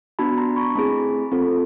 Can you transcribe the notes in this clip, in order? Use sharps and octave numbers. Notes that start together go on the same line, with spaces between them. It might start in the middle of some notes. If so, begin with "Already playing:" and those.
B3 D4 F#4 A5 B5
A#5 C6
B5 C#6
A3 C4 E4 G#4 A5 B5
C4 F4 A4